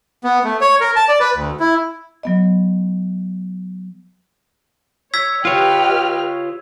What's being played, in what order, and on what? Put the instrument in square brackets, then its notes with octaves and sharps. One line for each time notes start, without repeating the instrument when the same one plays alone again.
[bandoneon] B3
A3
C#5
A#4
A5
D5
B4
D2
E4
[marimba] F#3 B3 D#5
[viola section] C#5 [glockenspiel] E6 G#6 B6
[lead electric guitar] F4 C#5 [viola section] G4 B4 D#5 [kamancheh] G5 F6